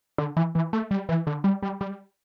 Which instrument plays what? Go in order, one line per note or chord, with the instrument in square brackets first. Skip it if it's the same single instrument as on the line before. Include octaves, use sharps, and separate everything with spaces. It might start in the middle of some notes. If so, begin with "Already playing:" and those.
[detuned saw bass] D3
E3
E3
A3
G3
E3
D3
G3
G3
G3